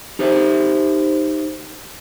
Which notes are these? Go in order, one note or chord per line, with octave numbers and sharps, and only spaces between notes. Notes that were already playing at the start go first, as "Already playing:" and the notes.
D#4 G4 C5 E5